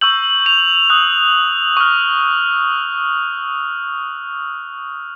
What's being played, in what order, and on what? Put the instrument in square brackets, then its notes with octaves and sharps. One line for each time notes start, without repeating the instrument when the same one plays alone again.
[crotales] C#6 E6 G6 F#7
F7
D#6 F#6
C#6 F6